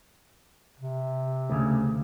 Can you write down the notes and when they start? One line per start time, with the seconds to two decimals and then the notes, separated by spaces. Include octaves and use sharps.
0.80 C3
1.50 D2 A2 C#3